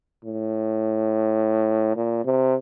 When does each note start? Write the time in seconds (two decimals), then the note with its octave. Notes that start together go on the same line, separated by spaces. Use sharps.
0.25 A2
1.96 A#2
2.25 C3